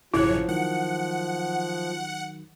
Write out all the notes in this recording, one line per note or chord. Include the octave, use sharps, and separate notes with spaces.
A1 F#2 C#3 F3 E4 C#5 F#6
D#3 F#3 F#5